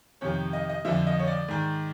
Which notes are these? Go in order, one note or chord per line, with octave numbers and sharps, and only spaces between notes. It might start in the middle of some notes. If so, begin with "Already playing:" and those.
F2 C3 D#3 C#5
D#5
D#5
F2 D3 F3 E5
D#5
C#5
D5
G#2 D#3